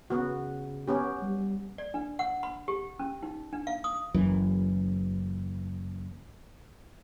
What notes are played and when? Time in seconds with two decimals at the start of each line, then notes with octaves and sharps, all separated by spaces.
0.10 C#3 B3 F#4
0.88 B3 C#4 G4
1.22 G3
1.78 D5
1.94 D4
2.19 F#5
2.43 B5
2.68 G4
2.99 C#4
3.23 D#4
3.53 D4
3.67 F5
3.84 D#6
4.14 F#1 F#2 E3